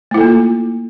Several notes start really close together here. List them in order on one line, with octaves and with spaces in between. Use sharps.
A3 E4 A4 A#3 F4